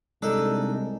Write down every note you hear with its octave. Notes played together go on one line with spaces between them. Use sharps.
C2 G#3 D4 D#4 A4